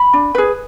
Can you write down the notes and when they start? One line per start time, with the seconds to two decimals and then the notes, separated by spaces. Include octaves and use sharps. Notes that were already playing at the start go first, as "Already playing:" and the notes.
Already playing: B5
0.13 D4
0.35 G#4 B4